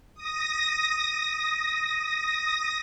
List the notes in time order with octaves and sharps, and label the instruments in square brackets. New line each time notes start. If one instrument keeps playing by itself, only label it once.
[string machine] D#6 A#6